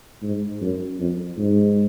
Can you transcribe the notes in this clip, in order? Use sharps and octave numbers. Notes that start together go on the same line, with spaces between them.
G#2
F#2
F2
G#2